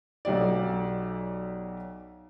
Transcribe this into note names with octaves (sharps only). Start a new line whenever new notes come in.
B1 F#3 G4 D5